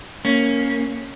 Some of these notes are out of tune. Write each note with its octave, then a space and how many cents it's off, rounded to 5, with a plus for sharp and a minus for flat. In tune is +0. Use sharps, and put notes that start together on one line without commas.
A#3 +0 C#4 +0